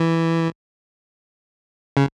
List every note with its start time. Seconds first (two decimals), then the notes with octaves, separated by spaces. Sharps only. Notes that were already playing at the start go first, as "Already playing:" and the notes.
Already playing: E3
1.97 C#3